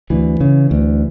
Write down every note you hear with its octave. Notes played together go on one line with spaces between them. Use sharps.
D2 E3
C#3
D2